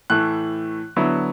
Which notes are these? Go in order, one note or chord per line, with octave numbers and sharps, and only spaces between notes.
A2 E3 A3 F#6
D3 F#3 B3 E4